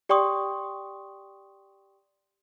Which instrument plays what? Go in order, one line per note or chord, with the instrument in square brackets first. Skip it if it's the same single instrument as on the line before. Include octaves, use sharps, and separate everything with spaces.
[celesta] G4 D5 G5 C6 C#6 D#6